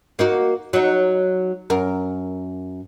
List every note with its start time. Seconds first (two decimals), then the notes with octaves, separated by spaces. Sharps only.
0.19 A#3 D#4 F#4
0.73 F#3 D#4
1.70 F#2 A#4